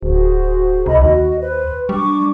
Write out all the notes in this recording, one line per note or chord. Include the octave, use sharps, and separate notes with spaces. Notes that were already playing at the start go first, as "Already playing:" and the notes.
D1 F#4 G#4 C5
C2 D#5 A#5 B5
D#2 F#4 D#5
B4 C5
G3 D4 C#6 D6